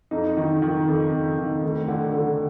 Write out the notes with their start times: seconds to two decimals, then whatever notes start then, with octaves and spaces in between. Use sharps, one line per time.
0.11 F2 D#4
0.37 D#3
0.62 D#3
0.88 F2
1.13 F2
1.38 D#3
1.63 D2
1.88 D3
2.13 D3